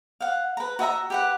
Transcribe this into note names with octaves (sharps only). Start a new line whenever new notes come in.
F5 F#5
B4 A#5
F#4 D#5 E5 A#5
G4 B4 F#5